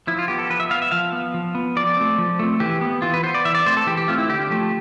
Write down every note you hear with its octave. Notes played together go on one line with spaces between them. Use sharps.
F3 E4
F4
B3 G4
A4
F3 B4
E5
B3 F5
E5
F3 F5
B3
F3
B3
F3 D5
A3 C4
F3
A3 C4
E3 G4
B3
E3 F4
B4
B3 C5
D5
E3 E5
D5
A3 C4 C5
A4
E3 G4
G4
A3 C4 F4
E4
D3 G4
F3 A3